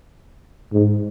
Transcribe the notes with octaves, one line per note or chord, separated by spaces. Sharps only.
G#2